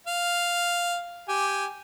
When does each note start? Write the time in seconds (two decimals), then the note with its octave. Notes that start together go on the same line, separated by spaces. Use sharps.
0.07 F5
1.28 G4 G#5